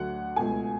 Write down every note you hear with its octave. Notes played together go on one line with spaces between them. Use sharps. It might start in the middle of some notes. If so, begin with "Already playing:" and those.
Already playing: D2 D3 F#3 A3 F#5
C#2 B2 A3 G#5